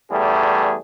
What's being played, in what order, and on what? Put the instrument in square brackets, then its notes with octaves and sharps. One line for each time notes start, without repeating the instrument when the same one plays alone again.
[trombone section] E2 G3 A3 G#4